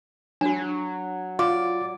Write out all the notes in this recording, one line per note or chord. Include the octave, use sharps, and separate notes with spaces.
F#3 D4 F#4
F4 D5 D6